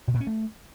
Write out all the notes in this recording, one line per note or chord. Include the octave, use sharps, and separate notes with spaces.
B2
A#2
C#4
A3